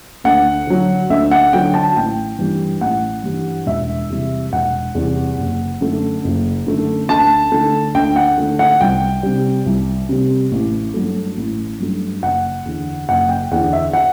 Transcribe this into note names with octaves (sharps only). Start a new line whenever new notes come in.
D2 F#5
D3 F#3
D2 E5
F#5
D3 F#3 G5
A5
A1 G5
G2 E3 G3
A1 F#5
G2 E3 G3
E1 E5
E2 C3 G3
E1 F#5
E2 C3 G3
F#1
F#2 D3 A3
F#1
F#2 D3 A3
D2 A5
D3 A3
D2 G5
F#5
D3 A3
F#5
C2 G5
C3 G3
C2
C3 G3
A1
G2 F#3 A3
A1
G2 F#3 A3
F#1 F#5
E2 D3
F#1 F#5
G5
E2 D3 F#5
E5
F#5